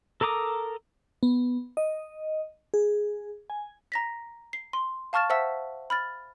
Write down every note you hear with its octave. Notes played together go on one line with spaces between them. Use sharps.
A4 A#4 A#5 D6 D#6
B3
D#5
G#4
G#5
A#5 A#6 B6
C7
C6
F5 A5 C#6 F6 A6 E7
C5 E5 F#5 A5 E6 B6
B5 F6 A6